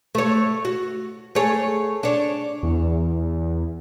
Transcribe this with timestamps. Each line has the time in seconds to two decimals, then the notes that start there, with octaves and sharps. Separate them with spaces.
0.15 A3 C#5
0.65 F#4
1.35 A3 G#4 C#5
2.03 D4 C#5
2.63 E2